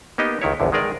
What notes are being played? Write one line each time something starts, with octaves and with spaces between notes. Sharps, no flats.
A#3 B3 D#4 G4 D#5
C#2 D#3 E4 C#5
A#1 E2 D3
D#3 G#3 G#4 A#4 D5